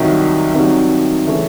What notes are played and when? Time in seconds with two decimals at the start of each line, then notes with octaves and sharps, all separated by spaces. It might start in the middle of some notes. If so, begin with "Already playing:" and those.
Already playing: C2 C3 D#3 F#3
0.54 C2 C3 D#3 F#3
1.27 C#3 E3 A3 C#4